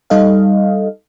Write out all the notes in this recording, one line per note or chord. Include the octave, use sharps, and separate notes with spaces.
G3 D#4 A4 D#5 F5